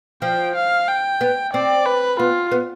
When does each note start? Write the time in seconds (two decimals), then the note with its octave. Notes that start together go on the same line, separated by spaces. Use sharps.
0.22 F3 G5
0.55 F5
0.88 G5
1.21 B3
1.53 C4 D5
1.86 B4
2.19 B3 F4
2.52 B3